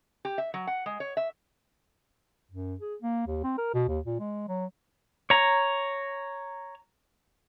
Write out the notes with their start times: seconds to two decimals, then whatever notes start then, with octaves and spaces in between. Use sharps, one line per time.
0.25 G4
0.38 E5
0.54 F#3
0.67 F#5
0.86 G#3
1.00 C#5
1.17 E5
2.51 F#2
2.80 G#4
3.02 A#3
3.27 D#2
3.43 C4
3.58 A#4
3.74 B2
3.88 D#2
4.06 A#2
4.19 G#3
4.48 F#3
5.30 C#5 A#5